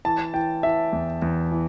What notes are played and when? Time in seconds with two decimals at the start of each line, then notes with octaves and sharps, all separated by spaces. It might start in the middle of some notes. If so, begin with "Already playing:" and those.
0.05 E3 A5
0.34 E3 G5
0.63 E3 E5
0.93 E2
1.22 E2
1.52 E3